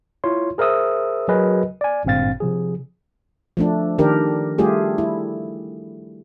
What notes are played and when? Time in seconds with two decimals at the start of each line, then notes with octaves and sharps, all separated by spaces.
0.24 E4 F4 C#5 C6
0.58 G#4 A#4 C5 E5 D#6 E6
1.28 F#3 F#4 G#4 A#4 B4 D#5
1.81 D5 G#5
2.05 G#1 G2 A#2 C4 F5 A6
2.40 C3 F3 G#4
3.57 F3 A3 D4
3.98 D#3 D4 G4 A#4
4.58 G3 A3 F4 G4 G#4
4.98 E4